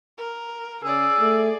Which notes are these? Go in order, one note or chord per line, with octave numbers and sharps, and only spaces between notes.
A#4
C#3 G#4 D5 E6
A3